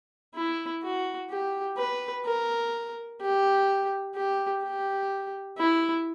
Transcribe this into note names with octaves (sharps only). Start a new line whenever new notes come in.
E4
F#4
G4
B4
A#4
G4
G4
G4
E4